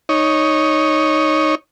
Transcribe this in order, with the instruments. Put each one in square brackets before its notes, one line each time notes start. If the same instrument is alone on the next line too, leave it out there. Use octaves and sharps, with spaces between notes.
[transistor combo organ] D#4 C#5